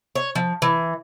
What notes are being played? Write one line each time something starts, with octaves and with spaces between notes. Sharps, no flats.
C#5
F3
E3